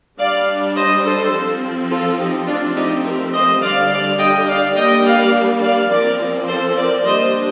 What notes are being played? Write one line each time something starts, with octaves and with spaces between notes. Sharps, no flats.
G3 D4 D5 F5
C5 D#5
A4 C5
F3 C4
F4 A4
D#4 G4
F3 A3 C4 D4 F4
D#4 G4
G4 A#4
C5 D#5
D3 G3 D4 D5 F5
D5 F5
D#5 G5
D5 F5
G3 A#3 D4 D#5 G5
D5 F5
D5 F5
F3 C4 A#4 D5
A4 C5
A#4 D5
G3 A#3 D4 C5 D#5